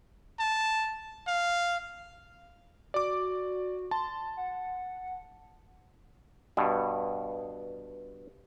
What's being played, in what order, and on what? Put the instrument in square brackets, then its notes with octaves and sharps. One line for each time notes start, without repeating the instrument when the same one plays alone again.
[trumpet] A5
F5
[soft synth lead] F#4 [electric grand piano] D5 D6
[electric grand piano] A5 [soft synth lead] C6
[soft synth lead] F#5
[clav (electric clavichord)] G2 B2